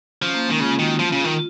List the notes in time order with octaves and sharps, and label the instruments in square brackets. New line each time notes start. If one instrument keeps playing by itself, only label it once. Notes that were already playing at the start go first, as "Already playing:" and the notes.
[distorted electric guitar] F3 [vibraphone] C#4
[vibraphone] A#3
[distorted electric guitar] D#3 [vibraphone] G#3
[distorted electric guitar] C#3 [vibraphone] F4
[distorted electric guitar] D#3 [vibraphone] F#4
[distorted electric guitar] F3 [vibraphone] F4
[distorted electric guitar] C#3
D#3